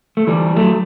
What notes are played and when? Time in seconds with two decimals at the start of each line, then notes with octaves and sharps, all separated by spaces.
0.17 A3
0.27 E3 G3
0.57 F#3 A3